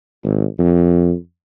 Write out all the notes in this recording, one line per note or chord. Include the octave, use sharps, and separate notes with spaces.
G#1
F2